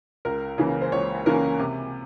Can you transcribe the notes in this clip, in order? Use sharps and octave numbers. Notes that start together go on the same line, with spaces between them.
C#2 A#4
C#3 E3 A#3 C#4
C5
C#2 C#5
C#3 E3 A#3 C#4 A#4
C3